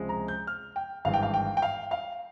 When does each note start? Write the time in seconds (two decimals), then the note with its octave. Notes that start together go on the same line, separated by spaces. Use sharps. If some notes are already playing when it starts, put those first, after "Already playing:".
Already playing: C#2 C3 F3 G#3
0.09 A#5
0.28 G6
0.47 F6
0.76 G5
1.05 G#1 G2 E3 G#3 F5
1.14 G5
1.23 F5
1.34 G5
1.57 G5
1.62 F5
1.91 F5